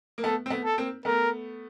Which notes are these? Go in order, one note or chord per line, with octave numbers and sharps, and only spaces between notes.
A#3
A3 B3 A4
C4
A3 B3
A4
A#3 C4
A3 B3 A#4